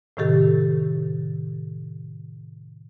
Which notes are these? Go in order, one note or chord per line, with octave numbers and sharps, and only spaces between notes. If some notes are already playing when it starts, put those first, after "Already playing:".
A2 C3 D#3 G4 A4